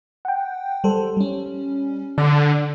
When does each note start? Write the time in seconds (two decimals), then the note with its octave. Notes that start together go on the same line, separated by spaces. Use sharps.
0.25 F#5 G5
0.84 G3 A4 C5
1.17 G3 C#4
2.18 D3 D5